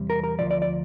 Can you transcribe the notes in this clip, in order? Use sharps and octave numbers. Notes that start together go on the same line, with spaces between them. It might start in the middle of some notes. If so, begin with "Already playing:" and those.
Already playing: E2 C3 G3
A#4
A#4
D2 C3 F3 D5
D5
D5